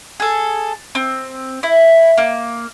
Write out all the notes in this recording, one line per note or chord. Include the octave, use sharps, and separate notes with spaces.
G#4 A4
C4
E4
A#3